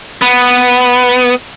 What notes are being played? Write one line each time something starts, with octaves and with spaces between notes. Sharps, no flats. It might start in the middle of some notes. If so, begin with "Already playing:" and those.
B3